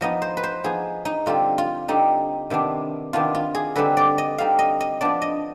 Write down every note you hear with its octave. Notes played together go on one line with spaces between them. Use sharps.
F3 B3 D#4 D#5
C5
B4
C5
F3 B3 D#4 G#4
D#4
D3 G3 C4 F4
F4
D3 G3 C4 D#4
C3 D#3 B3 D4
C3 D#3 B3 D4 F4
F4
G#4
D3 G3 C4 D#4 B4
D5
D#5
D3 G3 C4 D#4 F5
D#5
D#5
F3 B3 D4 D5
D#5